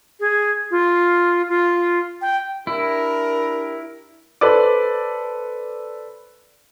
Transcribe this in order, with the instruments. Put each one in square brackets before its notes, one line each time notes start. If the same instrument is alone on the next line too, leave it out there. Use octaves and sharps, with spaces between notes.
[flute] G#4
F4
F4
G5
[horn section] D4 G4 A#4 [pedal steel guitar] E4
[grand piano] A4 B4 C5 D5 D6